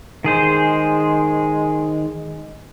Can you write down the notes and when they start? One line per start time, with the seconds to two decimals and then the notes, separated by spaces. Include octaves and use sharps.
0.24 D#3 G#3 G#4 C5